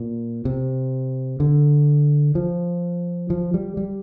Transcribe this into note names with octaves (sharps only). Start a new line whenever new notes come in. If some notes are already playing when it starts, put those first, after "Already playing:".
Already playing: A#2
C3
D3
F3
F3
G3
G3